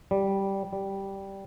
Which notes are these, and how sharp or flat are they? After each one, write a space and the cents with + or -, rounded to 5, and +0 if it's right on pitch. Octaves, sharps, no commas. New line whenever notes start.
G3 -5
G3 -5